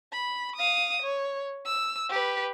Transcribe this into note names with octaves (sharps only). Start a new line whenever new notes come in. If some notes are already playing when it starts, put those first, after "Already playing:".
B5
F5 D#6
C#5
E6
G4 B4